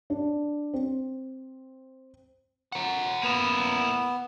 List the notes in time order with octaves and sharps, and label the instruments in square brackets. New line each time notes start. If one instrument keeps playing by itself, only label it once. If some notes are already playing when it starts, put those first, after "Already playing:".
[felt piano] D4
C4
[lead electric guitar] A#4 F#5
[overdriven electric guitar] A#3 E4 [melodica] B3